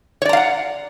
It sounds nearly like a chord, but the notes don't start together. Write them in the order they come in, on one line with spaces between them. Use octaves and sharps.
C#5 D5 A#5 F5 F#5